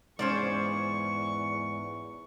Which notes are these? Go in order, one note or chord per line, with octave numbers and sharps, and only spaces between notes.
E2 G#2 C#4 C5 D5 C#6